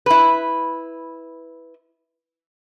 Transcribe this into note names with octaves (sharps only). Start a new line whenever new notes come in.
E4 B4